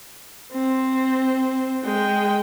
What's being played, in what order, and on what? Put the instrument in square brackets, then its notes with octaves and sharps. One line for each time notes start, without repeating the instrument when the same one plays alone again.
[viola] C4
G#3 G5